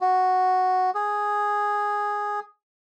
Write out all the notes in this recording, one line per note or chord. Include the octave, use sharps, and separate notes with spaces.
F#4
G#4